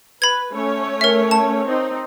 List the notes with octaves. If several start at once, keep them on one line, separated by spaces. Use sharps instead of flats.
B4 B5 G#6
A3 C#4 C#5
A#4 E5
A5
C4 D#4